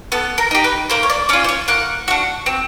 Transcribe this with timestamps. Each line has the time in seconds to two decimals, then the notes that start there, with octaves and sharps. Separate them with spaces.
0.12 B3 A4
0.38 A#4
0.51 D#4 G4
0.64 B4
0.90 A#3 C5
1.03 C#5
1.10 D5
1.29 C#4 F4 D5
1.44 C5
1.49 C#5
1.68 A#3 F#5
2.08 D4 F#4
2.46 C4